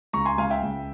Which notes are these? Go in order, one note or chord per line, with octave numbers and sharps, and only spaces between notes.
C#2 A#5 C#6
G#5 C6
C#2 F5 G#5
E5 G5
C#2